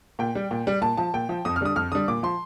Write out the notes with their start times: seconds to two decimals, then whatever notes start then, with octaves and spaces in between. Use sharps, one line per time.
0.19 A#2 G5
0.35 G3
0.51 A#2
0.67 G3
0.81 A#2 A5
0.97 F3 A5
1.14 A#2 G5
1.29 F3
1.45 F2 D#6
1.56 F6
1.61 D3 G3 D#6
1.76 F2 F6
1.92 D3 G3 D#6
2.08 A#2 D6
2.23 F3 C6